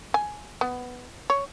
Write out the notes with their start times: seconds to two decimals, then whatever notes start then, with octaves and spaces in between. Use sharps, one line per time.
0.14 G#5
0.61 B3
1.30 C#5